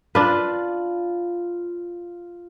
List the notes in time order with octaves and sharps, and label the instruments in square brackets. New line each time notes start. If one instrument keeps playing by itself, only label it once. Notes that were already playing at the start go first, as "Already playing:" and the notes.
[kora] D4 B4 [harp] F4